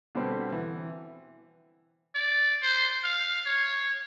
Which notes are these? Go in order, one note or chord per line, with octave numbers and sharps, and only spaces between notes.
B2 D3 G3 B3 C4
E3
D5
C5
F5
C#5